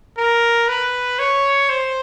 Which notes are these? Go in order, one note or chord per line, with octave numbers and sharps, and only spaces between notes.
A#4
B4
C#5
C5